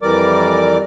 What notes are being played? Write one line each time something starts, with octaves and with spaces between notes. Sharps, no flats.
F2 E3 G3 A#4 D5 D6